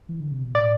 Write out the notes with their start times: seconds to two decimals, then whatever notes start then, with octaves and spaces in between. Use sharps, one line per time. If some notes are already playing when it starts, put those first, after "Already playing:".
0.09 E3
0.20 D3
0.31 C3
0.43 B2
0.54 A2 D5